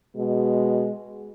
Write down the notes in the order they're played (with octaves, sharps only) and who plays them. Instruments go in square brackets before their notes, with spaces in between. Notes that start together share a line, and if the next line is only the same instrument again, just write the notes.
[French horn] B2 [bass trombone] G#3